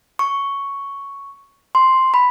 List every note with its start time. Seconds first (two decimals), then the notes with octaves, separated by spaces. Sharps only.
0.19 C#6
1.75 C6
2.14 B5